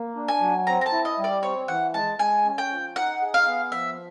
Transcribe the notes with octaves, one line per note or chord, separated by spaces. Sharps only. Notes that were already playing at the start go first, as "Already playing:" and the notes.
Already playing: A#3
D4
G#5
F#3
C4 A#5
A#5
A5
E4
D#5
G3
D5
C4 C#5
E3 F#5
G#3 A5
G#3 G#5
C#4
G5
F3
D#4 F#5
G#4
F5
B3
F3 E5